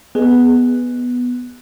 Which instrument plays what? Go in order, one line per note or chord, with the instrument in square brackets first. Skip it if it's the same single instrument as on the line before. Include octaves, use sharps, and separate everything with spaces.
[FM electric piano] B3 [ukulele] G#4 D#5